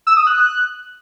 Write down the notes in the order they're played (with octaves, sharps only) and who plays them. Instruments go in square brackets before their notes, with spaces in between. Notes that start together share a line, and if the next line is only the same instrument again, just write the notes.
[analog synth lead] E6
D#6
F#6